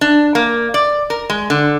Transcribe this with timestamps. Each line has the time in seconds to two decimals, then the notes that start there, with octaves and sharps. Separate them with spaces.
0.01 D4
0.35 A#3
0.74 D5
1.10 A#4
1.30 G#3
1.50 D3